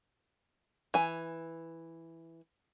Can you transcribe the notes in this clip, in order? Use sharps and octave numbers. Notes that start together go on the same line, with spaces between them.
E3 G#5